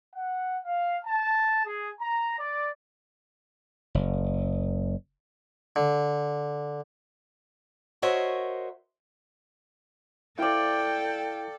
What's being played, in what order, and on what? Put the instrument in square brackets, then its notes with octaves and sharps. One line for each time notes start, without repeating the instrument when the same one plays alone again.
[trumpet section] F#5
F5
A5
G#4
A#5
D5
[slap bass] F#1
[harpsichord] D3
[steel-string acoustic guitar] F#4 A#4 C5 C#5 D#5 E5
[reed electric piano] E4 [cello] A4 [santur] D5 F5 [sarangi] G5